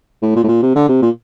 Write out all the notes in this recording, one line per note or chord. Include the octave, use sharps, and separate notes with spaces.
A2
A#2
A2
A#2
C3
D3
C3
A#2